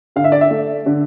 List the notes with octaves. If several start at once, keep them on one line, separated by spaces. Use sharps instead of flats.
D3 F5
E5
D5
E5
A3
D3